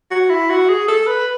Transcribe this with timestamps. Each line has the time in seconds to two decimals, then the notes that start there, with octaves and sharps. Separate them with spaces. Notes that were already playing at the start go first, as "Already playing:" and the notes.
0.11 F#4
0.30 E4
0.50 F#4
0.69 G#4
0.88 A4
1.07 B4